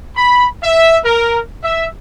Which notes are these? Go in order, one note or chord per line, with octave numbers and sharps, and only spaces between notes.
B5
E5
A#4
E5